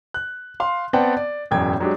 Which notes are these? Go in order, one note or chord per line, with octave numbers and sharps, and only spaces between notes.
F#6
F5 C6
B3 C4 D5 F#5 G5 A5
D5
E1 A1 F#2 G5 G#6
F#3 G#3 D4 G4